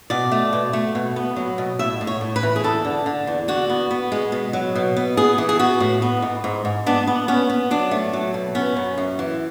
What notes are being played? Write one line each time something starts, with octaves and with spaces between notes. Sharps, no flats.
B2 D5
A3
B2
A3
B2
B3
F#3
B2
A2 E5
A2
C#5
A2
B4
E3
G#4
E2 A4
D3
D3
E2
D3 F#4
B3
B3
G#3
B2
F#3
B2
B3
B3 G#4
E3
G#4
B3 F#4
A2
B3
G#2
G#2
G#2
B3 D4
B3
B3 C#4
B3
F#3 D4
A3
F#3
B2
B3 C#4
F#2
F#2
E3